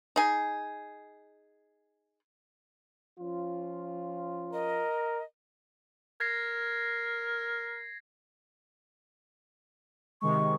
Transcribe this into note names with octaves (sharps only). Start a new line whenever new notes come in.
D#4 G#4
F3 C#4 F4
A#4 D#5
A#4 G#6 A#6 C7
C3 D#3 G#3 C#6